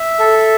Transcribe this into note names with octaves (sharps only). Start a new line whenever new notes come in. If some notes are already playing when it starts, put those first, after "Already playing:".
Already playing: E5
A4